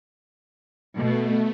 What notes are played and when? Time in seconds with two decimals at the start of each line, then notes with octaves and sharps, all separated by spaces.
0.97 B2 A3